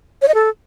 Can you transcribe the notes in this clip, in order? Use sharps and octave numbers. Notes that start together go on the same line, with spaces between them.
C#5
D#5
A4